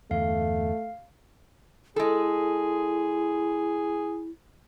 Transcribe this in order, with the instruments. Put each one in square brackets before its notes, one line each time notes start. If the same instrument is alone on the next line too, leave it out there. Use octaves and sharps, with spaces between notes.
[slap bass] E2 G2 D3 [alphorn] A3 [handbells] F5
[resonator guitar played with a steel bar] G#3 A4 [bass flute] E4 [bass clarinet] G#4